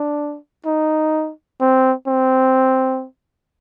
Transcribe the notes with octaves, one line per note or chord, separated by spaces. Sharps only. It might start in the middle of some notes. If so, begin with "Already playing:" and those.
Already playing: D4
D#4
C4
C4